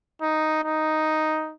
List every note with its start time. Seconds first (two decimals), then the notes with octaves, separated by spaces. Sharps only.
0.22 D#4
0.64 D#4